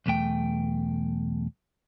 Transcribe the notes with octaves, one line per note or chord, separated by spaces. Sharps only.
B1 E2 A3 G5